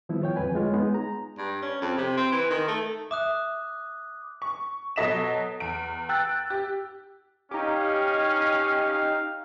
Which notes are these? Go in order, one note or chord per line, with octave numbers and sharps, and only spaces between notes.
D#3 F3 G3 B3 E4
F4 C#5 G5
F2 D3 F#3 B4 G#5
G#3 F4 C#5
G#3 B3 D#4
A#5
G2
C#4
F2
C3
C4
E3
D#3
A3
E5 D6 D#6 F#6
C#6
B2 F#3 A4 D#5 B6 E7
E2 D7
G5 E6 F#6 A6
G4
C#4 D#4 G4 F5